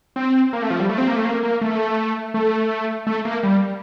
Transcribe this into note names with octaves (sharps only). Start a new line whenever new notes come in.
C4
A#3
A3
F3
G3
A3
C4
A#3
A3
A#3
A#3
A3
A3
A3
A#3
G3